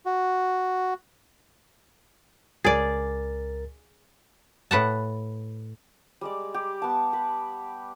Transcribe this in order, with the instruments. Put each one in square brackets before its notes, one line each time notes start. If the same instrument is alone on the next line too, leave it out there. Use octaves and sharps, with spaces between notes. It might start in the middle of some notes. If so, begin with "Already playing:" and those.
[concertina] F#4
[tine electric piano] C#2 A#4 A6 [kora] G#4 D5
[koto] A2 B4 F#5 A5
[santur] G3 G#3 D5
G4
B3 A5
B4